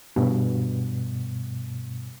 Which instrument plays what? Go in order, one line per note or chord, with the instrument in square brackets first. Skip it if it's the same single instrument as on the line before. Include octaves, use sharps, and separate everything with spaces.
[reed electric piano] G2 B2